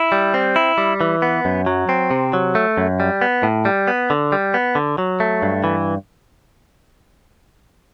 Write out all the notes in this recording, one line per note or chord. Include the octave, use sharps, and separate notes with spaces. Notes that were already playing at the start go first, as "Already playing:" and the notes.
Already playing: E4
G3
C4
E4
G3
E3
B3
F#2
F#3
C4
C3
F#3
A3
F#2
G3
B3
A2
G3
B3
D3
G3
B3
D3
F#3
A3
G2
E3